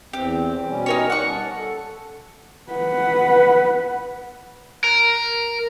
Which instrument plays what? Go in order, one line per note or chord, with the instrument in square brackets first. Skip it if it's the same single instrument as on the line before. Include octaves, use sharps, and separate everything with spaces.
[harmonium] E2 C4 [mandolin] G4
[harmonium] B2 G3 C#4
[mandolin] D#4 A#4 C#5
[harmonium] G3 C#4 [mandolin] F#5 C#6
[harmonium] A5
A4
[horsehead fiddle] B4 F#5
[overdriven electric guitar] A#4